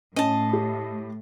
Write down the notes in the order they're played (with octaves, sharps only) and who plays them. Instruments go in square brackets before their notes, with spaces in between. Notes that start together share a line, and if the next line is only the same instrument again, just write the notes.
[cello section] A2 [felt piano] C#4 [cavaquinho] D#5 A5
[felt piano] G4